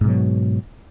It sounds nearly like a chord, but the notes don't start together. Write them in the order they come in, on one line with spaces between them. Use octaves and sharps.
G#2 B2 F#3